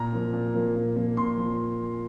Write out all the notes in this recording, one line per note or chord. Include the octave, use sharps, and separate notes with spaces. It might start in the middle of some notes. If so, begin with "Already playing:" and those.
Already playing: A#2 A#5
F3 A#3
A#2
F3 A#3
A#2
F3 A#3
A#2 C6
F3